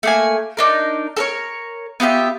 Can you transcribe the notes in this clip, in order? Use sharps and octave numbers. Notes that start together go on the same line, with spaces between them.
A3 A#3 G#5
D4 D#4 A#4
A4 A#4 C#5
B3 F4 G4 E5